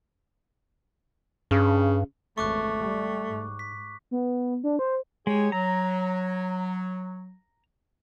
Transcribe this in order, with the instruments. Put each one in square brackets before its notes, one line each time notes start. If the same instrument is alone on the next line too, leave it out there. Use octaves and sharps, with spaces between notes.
[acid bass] G2 [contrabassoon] C#3
[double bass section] G#1 E2 C#3 [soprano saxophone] A3 [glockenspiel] C#6 D6 F#6
[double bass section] G3
G#2
[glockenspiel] B6
[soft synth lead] B3
D4
C5
[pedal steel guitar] G#3 [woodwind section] G4 G#4 C#5
[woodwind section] F#3 [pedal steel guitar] A#5